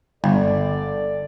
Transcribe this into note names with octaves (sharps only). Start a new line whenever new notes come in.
G1 A4 D5